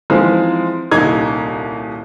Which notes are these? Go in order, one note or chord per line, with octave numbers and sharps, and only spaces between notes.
E3 F3 G#3 C4 D#4
D#1 C2 D#4 G#6